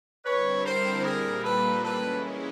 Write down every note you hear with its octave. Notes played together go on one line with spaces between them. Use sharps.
D3 G3 C4 E4 B4 C#5
A#4 C5
A#2 G3 A#3 G#4 A#4
A4 B4
E3 G#3 C#4 E4 A4 B4